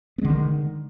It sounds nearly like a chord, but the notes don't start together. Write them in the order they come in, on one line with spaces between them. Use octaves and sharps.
B3 G#3 D3 D#3